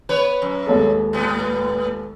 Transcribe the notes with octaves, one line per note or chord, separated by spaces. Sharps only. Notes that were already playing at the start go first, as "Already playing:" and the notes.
B3 B4 C#5
F#2
D#2 G#3 A4
A2 B3